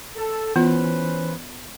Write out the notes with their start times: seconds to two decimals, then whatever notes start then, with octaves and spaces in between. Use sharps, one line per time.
0.16 A4
0.56 E3 B3 C#4 F4 B4 C5